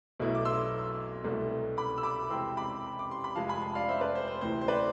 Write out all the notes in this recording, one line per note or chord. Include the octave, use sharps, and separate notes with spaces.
B1 B2 A3 E4
D6
C6 E6
C2 B2 A3
B5 D6
E6
B5 D6
E2 C3 G#3 C4 C6 E6
B5 D6
D6
C6
B5
F1 F2 C3 F3 G#3 F5 A5
G#5 B5
A5 C6
D5 F5
C5 E5
B4 D5
C5
C5
D2 C3 E3 C5
C5
B4 D5